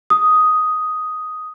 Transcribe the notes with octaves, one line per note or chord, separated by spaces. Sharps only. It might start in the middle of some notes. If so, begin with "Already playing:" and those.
D#6